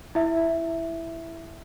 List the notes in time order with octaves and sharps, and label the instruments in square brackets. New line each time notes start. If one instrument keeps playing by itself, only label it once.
[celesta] E4 E5